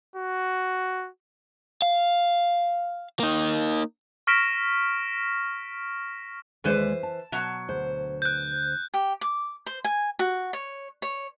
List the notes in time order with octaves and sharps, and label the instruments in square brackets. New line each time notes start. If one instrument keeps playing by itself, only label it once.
[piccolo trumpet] F#4
[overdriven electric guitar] F5
A#3 D#4
[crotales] C#6 F6 A#6 B6 D7 E7
[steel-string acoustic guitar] D#2 G#3 D5 [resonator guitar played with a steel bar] E3 B4 C5
[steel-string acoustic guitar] A5
[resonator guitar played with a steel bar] B2 F#3
[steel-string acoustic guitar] D2 C5
[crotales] F#6 G6
[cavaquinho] G4
D6
C5
G#5
F#4
C#5
C#5